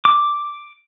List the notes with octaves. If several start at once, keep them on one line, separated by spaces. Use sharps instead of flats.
D6